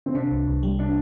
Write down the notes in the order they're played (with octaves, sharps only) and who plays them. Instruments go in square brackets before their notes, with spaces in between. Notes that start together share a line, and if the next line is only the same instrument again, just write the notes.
[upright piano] C4
[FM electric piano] C3 [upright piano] D4
[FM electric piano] C2
C2
G3
[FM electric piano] C3 [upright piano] D4